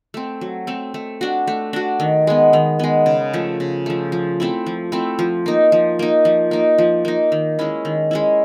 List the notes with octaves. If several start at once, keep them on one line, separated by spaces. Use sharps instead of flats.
A3 C4
F#3
A3 C4
A3
D4 F#4
A3
D4 F#4
D#3
G#3 B3
D#3
G#3 B3
C#3
F3 A3
C#3
F3 A3
F3
A3 C4 E4
F3
A3 C4 E4
F3
A#3 D#4
F3
A#3 D#4
F3
A#3 D#4
F3
A#3 D#4
D#3
G#3 C#4 E4
D#3
G#3 C#4 E4